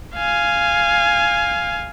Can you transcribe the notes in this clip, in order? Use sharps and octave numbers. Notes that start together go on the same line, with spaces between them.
F5 G#5